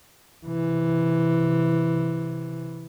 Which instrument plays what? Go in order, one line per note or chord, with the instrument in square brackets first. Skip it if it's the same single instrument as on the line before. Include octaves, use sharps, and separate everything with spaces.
[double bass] C3 E3